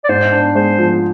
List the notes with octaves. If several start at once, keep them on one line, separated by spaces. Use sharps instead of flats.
D5
G#2 C5
D4
G#3 C5
F3